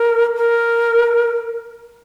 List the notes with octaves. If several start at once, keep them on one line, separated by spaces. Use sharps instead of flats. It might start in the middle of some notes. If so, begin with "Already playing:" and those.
Already playing: A#4
A#4